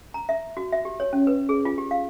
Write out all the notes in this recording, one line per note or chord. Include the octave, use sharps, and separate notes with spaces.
A#5
E5
F#4
E5
G4
C#5
C#4
B4
G#4
F4
G4
F5